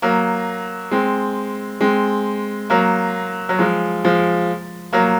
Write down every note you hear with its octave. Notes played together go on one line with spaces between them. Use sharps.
F#3 A#3
G#3 C4
G#3 C4
F#3 A#3
F#3
F3 G#3
F3 G#3
F#3 A#3